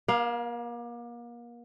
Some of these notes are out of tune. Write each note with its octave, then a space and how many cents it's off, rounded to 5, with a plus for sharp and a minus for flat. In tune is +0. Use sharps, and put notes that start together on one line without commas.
A#3 +35 F5 +0